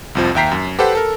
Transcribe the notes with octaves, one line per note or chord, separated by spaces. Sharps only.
C2 F2 F3
D#2 E5 G5 A#5 B6 C7
F#2
G4 A4 B4 C5 F#5
A4 A#4